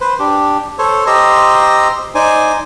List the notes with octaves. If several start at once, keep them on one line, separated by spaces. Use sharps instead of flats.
B4 C5
D4 G4
A4 C5 C#5
G4 C5 D#5 A#5 C6 E6
D#4 C5 D5 G#5